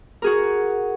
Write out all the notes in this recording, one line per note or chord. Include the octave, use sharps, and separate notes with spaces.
F#4 G#4 A#4